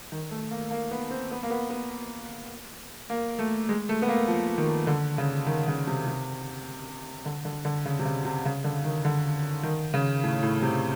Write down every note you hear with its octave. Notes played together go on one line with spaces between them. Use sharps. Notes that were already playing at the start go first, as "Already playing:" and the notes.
D#3
A3
A#3
A#3
B3
C4
B3
A#3
B3
B3
A#3
A3
G#3
A3
B3
A#3
F3
D#3
D3
C#3
D#3
C#3
C3
C3
D3
D3
D3
C#3
C3
C#3
C3
C#3
D3
D#3
D3
D#3
C#3
A2
A2
C3